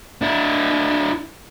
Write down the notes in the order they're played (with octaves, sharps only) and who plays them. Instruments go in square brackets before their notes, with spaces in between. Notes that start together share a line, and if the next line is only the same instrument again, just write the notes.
[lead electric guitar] D4 E4